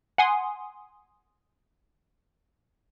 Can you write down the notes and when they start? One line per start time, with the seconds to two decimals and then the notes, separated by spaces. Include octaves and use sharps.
0.18 F#5 G#5 C6 D#6